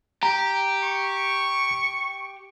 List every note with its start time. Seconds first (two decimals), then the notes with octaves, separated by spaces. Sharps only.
0.23 G4 A#5
0.83 C#6